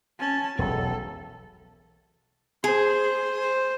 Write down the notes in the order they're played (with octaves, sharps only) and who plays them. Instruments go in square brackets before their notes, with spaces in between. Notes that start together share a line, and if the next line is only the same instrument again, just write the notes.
[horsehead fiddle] C#4 A5
[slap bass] E1 B1 [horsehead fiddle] A4
[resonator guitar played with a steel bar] G#4 [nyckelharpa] C5
[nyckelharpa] C5